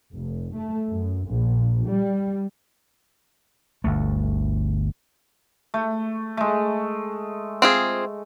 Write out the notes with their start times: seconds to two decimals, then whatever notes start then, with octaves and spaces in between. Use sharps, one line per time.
0.14 F1
0.55 A3
0.89 F#2
1.28 A#1
1.90 G3
3.84 G1 D2 A3
5.74 A3
6.37 G#3 A3
7.62 C4 F4 G#4